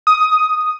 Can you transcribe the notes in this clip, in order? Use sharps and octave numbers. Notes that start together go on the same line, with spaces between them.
D#6